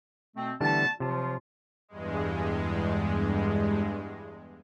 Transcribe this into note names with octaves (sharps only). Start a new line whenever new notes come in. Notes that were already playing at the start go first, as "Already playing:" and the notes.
B2 A3 C4
D3 E3 G3 A3 B3 A5
C3 F3 F#3 F4 A5
E2 G2 G#3